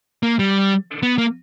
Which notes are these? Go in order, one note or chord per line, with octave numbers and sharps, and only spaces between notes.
A#3
G3
B3
A#3